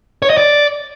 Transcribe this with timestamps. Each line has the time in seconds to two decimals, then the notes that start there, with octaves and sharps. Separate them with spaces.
0.22 C#5
0.30 D#5
0.37 D5